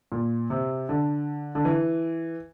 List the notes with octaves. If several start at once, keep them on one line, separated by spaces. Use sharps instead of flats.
A#2
C3
D3
D3
E3